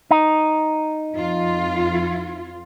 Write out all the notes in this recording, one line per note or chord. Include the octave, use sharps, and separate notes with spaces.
D#4
F2 F4